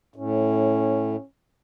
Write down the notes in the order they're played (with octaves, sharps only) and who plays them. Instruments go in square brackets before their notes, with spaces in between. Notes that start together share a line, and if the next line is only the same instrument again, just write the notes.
[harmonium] A2 [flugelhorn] C#4